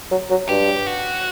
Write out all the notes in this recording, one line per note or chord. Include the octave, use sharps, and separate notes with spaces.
F#3
F#3
G2 G4
F#4